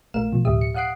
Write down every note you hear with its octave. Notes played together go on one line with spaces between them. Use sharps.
A#1 A3 A#4 F5 E7
B2 F3
D2 A2 G4 E5 D#6
C#7
F5 F#5 D#6 F#6 C7 D7